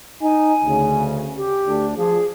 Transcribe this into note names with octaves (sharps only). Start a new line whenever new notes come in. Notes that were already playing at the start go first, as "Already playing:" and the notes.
D#4 G#5
D2 C#3
G4
D2 D4
F3 G#4